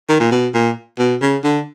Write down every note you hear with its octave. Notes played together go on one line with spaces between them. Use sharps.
D#3
A#2
B2
A#2
B2
C#3
D3